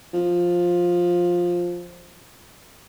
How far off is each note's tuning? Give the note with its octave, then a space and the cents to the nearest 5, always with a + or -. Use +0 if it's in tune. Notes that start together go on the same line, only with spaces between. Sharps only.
F3 +10